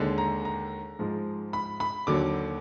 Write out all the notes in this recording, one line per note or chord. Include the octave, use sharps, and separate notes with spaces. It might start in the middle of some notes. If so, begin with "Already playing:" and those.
Already playing: D#2 D3 G#3
A#5
A#5
G#2 F3 G#3
B5
B5
D#2 D3 F#3 D6